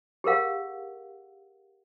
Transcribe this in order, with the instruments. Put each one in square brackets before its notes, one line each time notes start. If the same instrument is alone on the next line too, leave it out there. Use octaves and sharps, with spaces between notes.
[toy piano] G4 G#4 A#4 F5 F#5